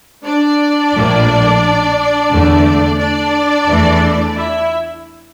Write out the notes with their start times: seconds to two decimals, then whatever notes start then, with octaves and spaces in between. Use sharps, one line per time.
0.25 D4 D5
0.94 A#1 A2 F3 A#3
2.30 E2 D3 A3
2.98 D4 D5
3.67 E2 E3 A3
4.35 E4 E5